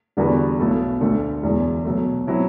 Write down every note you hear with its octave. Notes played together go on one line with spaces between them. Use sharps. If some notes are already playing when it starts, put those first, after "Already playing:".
E2 D3 G3 B3 F#4
B1 B2 A3 E4 A4
D2 D3 A3
E1 E2 B2
B2 F#3 A3
B2 F#3 C4 E4